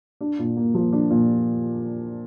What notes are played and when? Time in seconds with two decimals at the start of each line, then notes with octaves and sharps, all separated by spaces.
0.21 D4
0.39 A#2
0.56 A#3
0.74 F3
0.93 D4
1.10 A#2